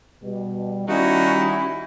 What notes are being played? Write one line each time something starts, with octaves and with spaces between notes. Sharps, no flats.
B2 G3
D#3 G3 C#4 D#4 E4 F#4